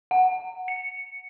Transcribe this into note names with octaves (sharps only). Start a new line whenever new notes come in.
F#5
C#7